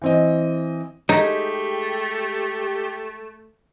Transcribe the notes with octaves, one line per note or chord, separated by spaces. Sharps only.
E3 C4 D#5
G#3 A3 D#4 G4